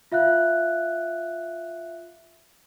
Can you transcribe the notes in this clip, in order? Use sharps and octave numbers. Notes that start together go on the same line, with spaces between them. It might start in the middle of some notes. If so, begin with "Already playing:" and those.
F4 E5 F5 F#6